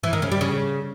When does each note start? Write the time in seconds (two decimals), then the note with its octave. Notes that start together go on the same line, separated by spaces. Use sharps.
0.03 E3
0.13 D#3
0.22 C#3
0.32 G3
0.41 C#3